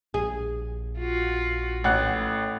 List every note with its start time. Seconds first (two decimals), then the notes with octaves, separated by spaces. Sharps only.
0.14 A#1 G#4
0.99 F4 F#4
1.84 A1 A2 F#5 F#6